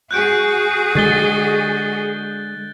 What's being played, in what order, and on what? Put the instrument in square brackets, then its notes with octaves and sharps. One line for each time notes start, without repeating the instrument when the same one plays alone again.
[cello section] F#4 G#4 [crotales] F#6 G6 D7
[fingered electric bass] D3 G#3 [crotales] G6 A6 G7